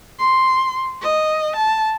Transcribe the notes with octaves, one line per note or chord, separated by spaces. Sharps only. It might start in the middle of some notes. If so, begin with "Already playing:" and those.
C6
D#5
A5